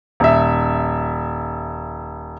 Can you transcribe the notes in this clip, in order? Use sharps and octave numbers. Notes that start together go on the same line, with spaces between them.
D#1 E5